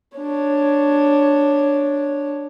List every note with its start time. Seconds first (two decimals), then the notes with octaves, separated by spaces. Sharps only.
0.18 D4 C#5